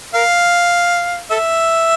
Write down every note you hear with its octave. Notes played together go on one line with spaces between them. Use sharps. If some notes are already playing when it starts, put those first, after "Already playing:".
A#4 F5
A4 E5